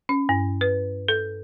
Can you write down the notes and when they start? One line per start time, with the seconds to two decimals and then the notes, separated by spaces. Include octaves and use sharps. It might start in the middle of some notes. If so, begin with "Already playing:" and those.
0.09 C#4
0.29 G2
0.61 B4
1.08 A4